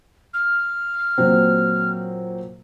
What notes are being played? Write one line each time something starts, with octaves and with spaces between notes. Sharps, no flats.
F6
A#2 F#3 C4